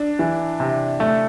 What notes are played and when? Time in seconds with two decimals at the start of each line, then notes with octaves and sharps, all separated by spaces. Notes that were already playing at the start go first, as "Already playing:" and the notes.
Already playing: D4
0.19 E3
0.60 C3
1.00 A3